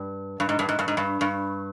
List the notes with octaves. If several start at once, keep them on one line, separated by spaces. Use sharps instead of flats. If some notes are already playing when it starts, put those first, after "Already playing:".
Already playing: G2
G2
G#2
G2
G#2
G2
G#2
G2
G2